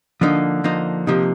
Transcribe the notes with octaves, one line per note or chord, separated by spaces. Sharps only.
D3 F3 A#3 D#4
F3 A#3 D#4
C3 F3 A#3 D#4